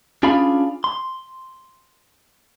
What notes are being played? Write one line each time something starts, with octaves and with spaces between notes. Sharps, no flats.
C#4 D4 F4 G#4 F5 B5
C6